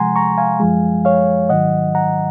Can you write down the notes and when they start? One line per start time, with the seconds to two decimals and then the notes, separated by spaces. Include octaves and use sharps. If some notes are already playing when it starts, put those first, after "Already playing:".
Already playing: C3 F3 G#3 F#5 G#5 A#5 C6
0.16 A#5 C#6
0.38 F5 G#5
0.60 F#2 F3 G#3
1.05 C#5 F5
1.49 G#2 D#3 F#3 D#5 F#5
1.95 F#5 A#5